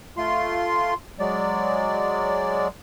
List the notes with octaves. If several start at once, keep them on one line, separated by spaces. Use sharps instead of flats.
A3 F4 C6
F#3 G#3 D5